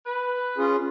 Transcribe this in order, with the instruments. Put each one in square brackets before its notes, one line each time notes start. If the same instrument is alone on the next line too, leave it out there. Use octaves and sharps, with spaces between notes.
[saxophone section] B4
[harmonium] C#4 F4 G#4